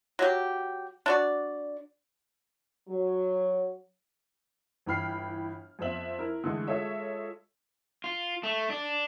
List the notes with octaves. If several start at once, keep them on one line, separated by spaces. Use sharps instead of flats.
F#3 G4
D4 F#4 D5
F#3
G1 E3 G5 B5 F6 C7
F2 F3 B3 C4 E5 F#7
E4 A#4
D3 E3 G#3 A3
G#3 F4 A4 C#5 E5
F4
A3
D4